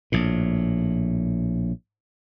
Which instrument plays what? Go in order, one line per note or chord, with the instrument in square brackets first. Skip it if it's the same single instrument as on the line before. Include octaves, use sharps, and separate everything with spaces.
[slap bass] A#1 A2